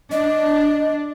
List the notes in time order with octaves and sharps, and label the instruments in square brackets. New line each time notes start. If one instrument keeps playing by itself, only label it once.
[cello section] D4 [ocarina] D#5